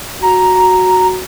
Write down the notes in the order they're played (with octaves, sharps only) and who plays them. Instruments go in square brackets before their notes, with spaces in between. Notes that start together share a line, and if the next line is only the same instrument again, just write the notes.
[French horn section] F#4 [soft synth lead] A#5